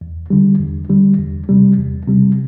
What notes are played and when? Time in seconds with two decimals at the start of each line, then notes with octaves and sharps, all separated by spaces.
0.01 E2
0.30 D3 G3
0.60 E2
0.90 D3 G3
1.19 E2
1.49 C3 G3
1.78 E2
2.08 C3 G3